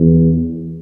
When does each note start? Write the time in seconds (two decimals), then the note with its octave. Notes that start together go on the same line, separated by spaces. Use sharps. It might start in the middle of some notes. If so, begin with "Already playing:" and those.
Already playing: E2